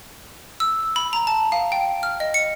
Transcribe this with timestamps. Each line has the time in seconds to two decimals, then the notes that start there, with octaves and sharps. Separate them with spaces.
0.60 E6
0.96 B5
1.13 A#5
1.27 A5
1.52 F5
1.72 G5
2.03 F6
2.20 D#5
2.34 C#7